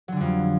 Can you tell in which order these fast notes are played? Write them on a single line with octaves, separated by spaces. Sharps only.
F#3 D3 G3 F2